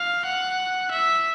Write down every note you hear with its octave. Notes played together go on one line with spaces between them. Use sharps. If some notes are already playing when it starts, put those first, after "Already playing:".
Already playing: F5
F#5
E5